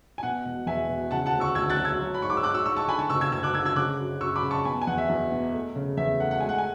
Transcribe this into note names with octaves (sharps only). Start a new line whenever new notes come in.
G#5
B2 F#5
E1
E2 E5 G#5
E1
C#3 F#5 A5
F#5 A5
D2
C#6 E6
D2 E6 G#6
F#6 A6
F#3
E6 G#6
F#3
B5
G#2 C#6
D6
E6
G#2 D6 F#6
C#6 E6
G#2 C#6 E6
A5 C#6
D3 G#5 B5
A5 C#6
F#1 C#6 E6
E6 G#6
F#1 E6 G#6
D6 F#6
D3 E6 G#6
E6 G#6
C#3 D6 F#6
F#2
F#2 C#6 E6
B5 D6
C#3
A5 C#6
B2 G#5 B5
G#5
E2 F#5
E5
E2
B2
A3
C#3
E2 E5
A3 F#5
F#5
G#3 G#5
F#5
G#5